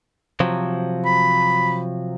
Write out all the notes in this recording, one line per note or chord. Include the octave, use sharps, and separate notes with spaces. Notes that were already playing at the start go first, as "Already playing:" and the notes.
C3 F3 F#3
B5